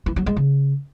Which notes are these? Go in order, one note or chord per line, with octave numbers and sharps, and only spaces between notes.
E3
F#3
G#3
C#3